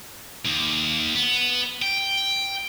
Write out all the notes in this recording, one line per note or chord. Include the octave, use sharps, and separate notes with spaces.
D#2
B3
G5